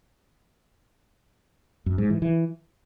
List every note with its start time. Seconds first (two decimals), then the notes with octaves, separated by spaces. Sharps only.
1.86 F#2
1.98 G#2
2.10 E3
2.22 E3